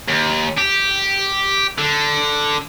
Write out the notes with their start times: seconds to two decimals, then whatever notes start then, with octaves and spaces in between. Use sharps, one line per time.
0.08 D#2
0.58 G4
1.79 D3